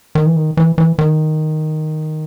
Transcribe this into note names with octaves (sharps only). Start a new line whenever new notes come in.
D#3
E3
D#3
E3
E3
D#3